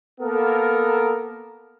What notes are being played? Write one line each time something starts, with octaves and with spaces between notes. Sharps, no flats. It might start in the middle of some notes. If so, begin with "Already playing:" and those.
A#3 B3 A4 A#4